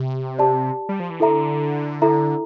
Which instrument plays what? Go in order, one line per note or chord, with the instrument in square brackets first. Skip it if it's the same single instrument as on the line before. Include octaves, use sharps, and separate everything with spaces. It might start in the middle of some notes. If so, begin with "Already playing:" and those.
Already playing: [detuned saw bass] C3 [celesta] G4
[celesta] G4 D5 A5
[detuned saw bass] G3
F3
E3
[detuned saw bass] D3 [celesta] E4 A4 E5 A#5
[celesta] E4 A4 E5 A#5